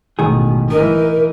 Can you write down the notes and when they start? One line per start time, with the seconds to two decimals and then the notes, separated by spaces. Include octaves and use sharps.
0.19 A1 G#2 B2 D#3 G#4
0.71 E3 D#4 A#4